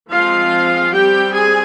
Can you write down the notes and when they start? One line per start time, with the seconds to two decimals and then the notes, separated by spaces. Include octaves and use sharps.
0.12 F3 G#3 C4 F4 F5
0.93 G3 C4 G4 G5
1.33 G#4 G#5